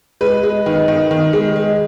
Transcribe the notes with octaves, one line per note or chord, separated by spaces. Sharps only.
G#3 B4
G#3
D#3
D#3
D#3
G#3
G#3